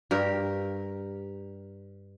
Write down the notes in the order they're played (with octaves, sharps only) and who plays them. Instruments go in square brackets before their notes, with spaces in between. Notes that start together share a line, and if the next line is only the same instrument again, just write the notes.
[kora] G2 G4 A#4